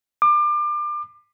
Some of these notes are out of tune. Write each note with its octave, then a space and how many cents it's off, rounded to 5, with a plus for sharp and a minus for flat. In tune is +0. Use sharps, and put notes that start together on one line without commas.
D6 +30